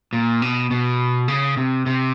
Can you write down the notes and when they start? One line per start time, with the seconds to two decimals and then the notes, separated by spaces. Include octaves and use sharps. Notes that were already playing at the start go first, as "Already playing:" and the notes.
0.13 A#2
0.42 B2
0.71 B2
1.28 C#3
1.57 C3
1.86 C3